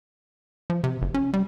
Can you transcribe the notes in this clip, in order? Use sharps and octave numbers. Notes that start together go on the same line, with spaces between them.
F3
C3
F#1
C#4
G3